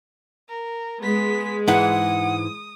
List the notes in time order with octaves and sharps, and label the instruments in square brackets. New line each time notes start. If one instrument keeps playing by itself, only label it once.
[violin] A#4
[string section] G#3 [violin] B3 B6
[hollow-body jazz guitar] G#2 E3 [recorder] F#5 [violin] D#6